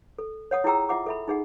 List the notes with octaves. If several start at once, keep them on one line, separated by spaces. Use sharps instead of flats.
A4
C#5 F#5 D#6
E4 F4 G#4 G5 A#5 E6
F4 E5 F#5 D6
A4 E5 B5
D#4 G#4 F#5